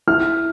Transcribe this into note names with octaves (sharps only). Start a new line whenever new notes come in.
E4 F6